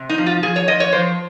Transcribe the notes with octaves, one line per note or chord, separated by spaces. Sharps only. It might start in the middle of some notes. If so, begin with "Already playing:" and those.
Already playing: C3
D#4
F3
F4
F3 G#4
C#5
F3 D#5
C#5
F3 C5